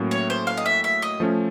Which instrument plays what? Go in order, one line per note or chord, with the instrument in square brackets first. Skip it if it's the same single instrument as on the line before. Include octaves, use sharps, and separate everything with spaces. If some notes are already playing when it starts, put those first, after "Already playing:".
Already playing: [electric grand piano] A2 F#3 A#3 C#4
[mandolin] C#5
C5
F5
D#5
E5
E5
D#5
[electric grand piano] F3 A3 C#4